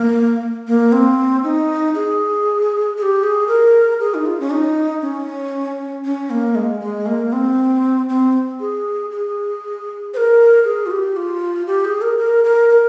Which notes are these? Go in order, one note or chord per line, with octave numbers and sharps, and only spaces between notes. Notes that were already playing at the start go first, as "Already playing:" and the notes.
Already playing: A#3
A#3
C4
D#4
G#4
G#4
G4
G#4
A#4
G#4
D#4
F4
C#4
D#4
C#4
C#4
A#3
G#3
G#3
A#3
C4
C4
G#4
G#4
C5
A#4
G#4
F4
G4
F4
G4
G#4
A#4
A#4
A#4
A#4